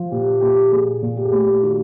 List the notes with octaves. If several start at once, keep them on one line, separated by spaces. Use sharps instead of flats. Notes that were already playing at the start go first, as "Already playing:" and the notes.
Already playing: F3
A#2 G4
A#2 G4
A#2 G#4
A#2
G4
G#4
A3 G4
D#3 F#4